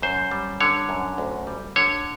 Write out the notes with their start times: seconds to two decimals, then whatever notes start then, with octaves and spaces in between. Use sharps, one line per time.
0.02 F#2 C5
0.31 G3
0.60 D3 C#5
0.89 F#2
1.18 D2
1.47 G3
1.76 D3 C#5